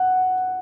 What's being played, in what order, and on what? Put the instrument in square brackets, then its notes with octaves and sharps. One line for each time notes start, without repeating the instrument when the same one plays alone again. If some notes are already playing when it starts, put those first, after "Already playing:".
Already playing: [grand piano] F#5